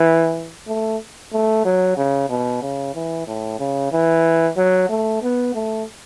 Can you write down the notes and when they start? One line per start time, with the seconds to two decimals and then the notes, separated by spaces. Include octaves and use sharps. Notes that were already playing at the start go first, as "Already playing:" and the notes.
Already playing: E3
0.68 A3
1.33 A3
1.65 F#3
1.97 C#3
2.30 B2
2.62 C#3
2.95 E3
3.27 A2
3.60 C#3
3.92 E3
4.57 F#3
4.90 A3
5.22 B3
5.55 A3